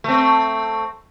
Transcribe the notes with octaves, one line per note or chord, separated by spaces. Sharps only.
A3 C4